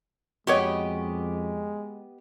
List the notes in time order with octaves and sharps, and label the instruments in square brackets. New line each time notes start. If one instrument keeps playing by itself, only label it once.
[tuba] F2 [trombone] G#3 [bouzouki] B3 G4 D#5 [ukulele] F#4 C#5